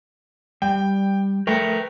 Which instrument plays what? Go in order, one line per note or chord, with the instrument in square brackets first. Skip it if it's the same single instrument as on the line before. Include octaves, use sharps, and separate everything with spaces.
[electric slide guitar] G3 [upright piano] G5
[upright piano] A3 [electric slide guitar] A#4 B4 G5